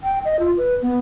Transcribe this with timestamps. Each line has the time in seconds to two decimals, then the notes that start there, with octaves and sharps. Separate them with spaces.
0.03 G5
0.25 D#5
0.39 F4
0.57 B4
0.82 B3